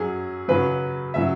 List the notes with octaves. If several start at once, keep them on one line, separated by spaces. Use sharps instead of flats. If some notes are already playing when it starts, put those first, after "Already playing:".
Already playing: F#2 F#3 G#4
F#2 C#3 F#3 B4
C#3 F#3 E5